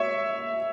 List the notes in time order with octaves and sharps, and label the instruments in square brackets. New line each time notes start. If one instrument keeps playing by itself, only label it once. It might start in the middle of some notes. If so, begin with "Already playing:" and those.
Already playing: [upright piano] C#5 E5